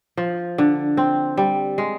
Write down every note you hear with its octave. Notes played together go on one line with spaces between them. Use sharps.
F3
D3
C4
G3
G#3